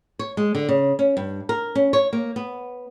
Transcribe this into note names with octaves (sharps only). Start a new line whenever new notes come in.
C#5
G#3
D3
C#3
C#4
G2
A#4
C#4
C#5
A#3
B3